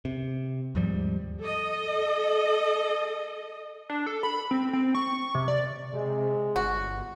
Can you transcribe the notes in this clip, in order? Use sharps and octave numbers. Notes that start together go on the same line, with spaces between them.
C3
D#2 G#2 F3 G3
A4 D#5
D4
A4
B5
C4
C4
C#6
C3
D5
C3 G#3
G1 F#4